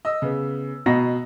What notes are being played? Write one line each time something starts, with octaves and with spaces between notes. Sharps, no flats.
D#5 E6
C#3 B3
B2 D#5 A#5 A#6